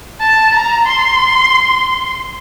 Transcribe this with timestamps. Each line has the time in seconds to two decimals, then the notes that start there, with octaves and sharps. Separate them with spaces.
0.21 A5
0.54 A#5
0.87 C6